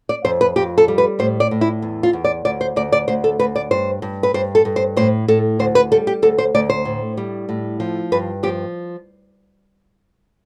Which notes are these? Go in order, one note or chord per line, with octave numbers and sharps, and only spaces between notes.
D5
F2 C5
B4
F2 G4
A4
G3
B4
A2 C5
D5
A2
E4
E2
F4
E2
D5
D2 D5
C5
D2 D5
D5
D2 C5
A4
D2 B4
D5
G2 C5
G2
B4
G2 C5
A4
G2
C5
A2 C5
A2 A4
D2 C5
B4
G3 A4
G4
D2 A4
C5
D2 D5
C5
A2
G3
A2
F3
G2 B4
F3 G4